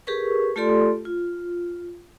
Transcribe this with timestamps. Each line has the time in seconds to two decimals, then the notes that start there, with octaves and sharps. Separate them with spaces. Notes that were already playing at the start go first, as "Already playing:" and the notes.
0.07 G4 G#4 A#4 B4 C#6
0.56 A3 F4 G4 A4 D5 C6
1.05 F4